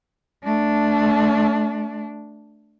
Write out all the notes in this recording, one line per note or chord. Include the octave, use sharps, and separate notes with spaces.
A3 D4